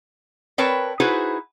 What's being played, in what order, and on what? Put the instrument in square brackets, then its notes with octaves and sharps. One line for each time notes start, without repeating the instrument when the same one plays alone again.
[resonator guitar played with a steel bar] C4 A#4 B4 C#5 G5 A5
D#4 E4 F#4 G#4 B4 C5